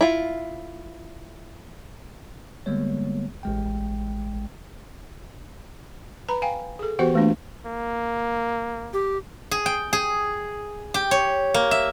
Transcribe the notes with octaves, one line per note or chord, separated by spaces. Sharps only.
E4 F4
D3 G3 G#3 A#3 B3 C#5
A1 G#3 G5
B4 A#5 B5
F5 G5 G#5
G#4 A4
E3 B3 F#4 G4 C5 F#5
E3 A3 A#3 D4 F4
A#3
G4
G#4
G5
G#4
G4
C#5
A#3
E5